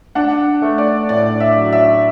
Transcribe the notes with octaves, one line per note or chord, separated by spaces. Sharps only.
D4 F#5
A3
D5
A2 D5
E5
F#3
E5